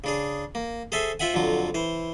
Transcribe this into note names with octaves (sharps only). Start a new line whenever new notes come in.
C#3 D4 G#4
A#3
G#4 A4 C5 E5 G#5
F4 C5 E5 F#5 G#5
F2 D3 F#3 F4
E3 C5